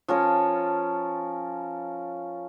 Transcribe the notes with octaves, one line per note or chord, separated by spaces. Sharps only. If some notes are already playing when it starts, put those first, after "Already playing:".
F3 C#4 A#4